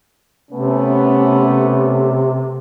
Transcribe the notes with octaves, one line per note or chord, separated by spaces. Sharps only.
C3 A3 B3 C#4